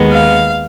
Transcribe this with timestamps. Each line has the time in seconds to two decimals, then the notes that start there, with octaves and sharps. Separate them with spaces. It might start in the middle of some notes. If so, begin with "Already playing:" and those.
Already playing: D#2 D#3 G#3 B3
0.10 F5